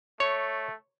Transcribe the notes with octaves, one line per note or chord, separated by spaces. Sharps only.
A3 C#5